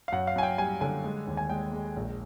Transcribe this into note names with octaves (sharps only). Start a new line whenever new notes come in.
F5
F#2 F#5
F5
F#2 G#5
G5
G3 G#5
D3 G#5
G#3
D#2
G#5
G#3 G5
G#3
A#1